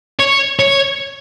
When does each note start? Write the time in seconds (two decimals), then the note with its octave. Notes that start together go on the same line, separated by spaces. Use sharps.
0.20 C#5
0.59 C#5